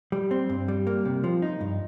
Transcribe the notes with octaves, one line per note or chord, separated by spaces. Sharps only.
G3
C4
G2
G3
A#3
C3
F3
D#4
G2